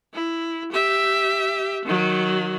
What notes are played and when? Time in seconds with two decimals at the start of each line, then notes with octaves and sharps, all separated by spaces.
0.13 E4
0.72 G4 E5
1.85 D#3 F#3